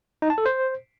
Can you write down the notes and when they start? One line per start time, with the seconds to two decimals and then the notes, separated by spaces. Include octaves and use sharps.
0.22 D#4
0.30 A5
0.38 A4
0.46 C5